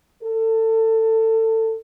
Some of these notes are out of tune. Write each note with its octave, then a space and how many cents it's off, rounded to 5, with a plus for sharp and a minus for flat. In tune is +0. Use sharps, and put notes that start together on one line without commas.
A4 +25